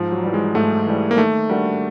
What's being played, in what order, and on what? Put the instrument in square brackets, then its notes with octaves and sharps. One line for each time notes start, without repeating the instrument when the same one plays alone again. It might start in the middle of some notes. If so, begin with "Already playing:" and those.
Already playing: [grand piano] G#2 [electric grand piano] F3
[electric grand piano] F#3
[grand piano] E3 G3
[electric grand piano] G#3
[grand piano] G#2 [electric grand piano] A3
[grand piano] E3 G3
[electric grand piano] A#3
[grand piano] D#3 [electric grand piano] A3
[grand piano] G3 A#3 D4 F#4